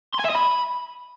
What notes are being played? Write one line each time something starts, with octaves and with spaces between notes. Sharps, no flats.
C6
G#5
E5
D#5
B5